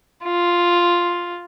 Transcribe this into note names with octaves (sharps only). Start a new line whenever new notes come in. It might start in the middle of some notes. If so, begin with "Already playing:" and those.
F4